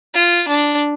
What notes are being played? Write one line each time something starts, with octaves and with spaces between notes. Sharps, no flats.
F4
D4